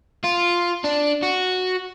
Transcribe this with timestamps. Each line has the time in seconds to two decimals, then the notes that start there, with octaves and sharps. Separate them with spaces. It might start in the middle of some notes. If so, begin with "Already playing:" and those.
0.24 F4
0.84 D4
1.23 F#4